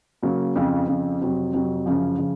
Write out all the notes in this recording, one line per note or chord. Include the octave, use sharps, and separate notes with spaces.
C#3 F#3 A#3
F2 C#3 F3
F2 C#3 F3
F2 C3 F#3
F2 C3 F#3
F#2 C#3 F3
C#3 F3